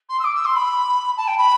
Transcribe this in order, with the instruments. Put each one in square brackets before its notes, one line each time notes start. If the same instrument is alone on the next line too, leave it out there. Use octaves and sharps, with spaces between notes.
[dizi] C6
E6
D6
E6
C6
B5
A5
G5
B5